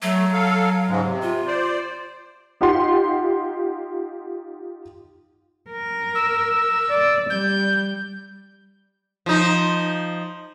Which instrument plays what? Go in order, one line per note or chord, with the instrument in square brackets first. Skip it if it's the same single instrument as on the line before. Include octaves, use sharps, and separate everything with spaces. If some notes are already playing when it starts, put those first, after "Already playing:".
[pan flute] F#3 [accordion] A3
[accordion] A4 F5
G#2 C#3 G#3
C3
[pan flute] F4
[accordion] C5 D5
[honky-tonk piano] D#4 F4 G4 F#5 C6
[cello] A#4
[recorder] E6
[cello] D5
[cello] G3 [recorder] G6
[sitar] F3 D#4